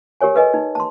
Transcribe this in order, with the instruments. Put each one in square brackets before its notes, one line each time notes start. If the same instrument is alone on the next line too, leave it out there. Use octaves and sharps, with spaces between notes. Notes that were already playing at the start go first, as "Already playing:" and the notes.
[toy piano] G4 A#4 C#5 G#5
A4 B4 D#5 G#5
D#4
A5 C6